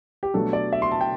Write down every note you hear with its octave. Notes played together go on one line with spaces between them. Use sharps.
G4
B2 F#3 A3 D4 A4
D5
E5
C6
A5
G5